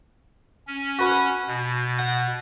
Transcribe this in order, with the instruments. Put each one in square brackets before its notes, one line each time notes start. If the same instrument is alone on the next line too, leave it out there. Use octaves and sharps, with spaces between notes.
[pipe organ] C#4
[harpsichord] F#4 B4 F#5
[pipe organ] B2
[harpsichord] F#5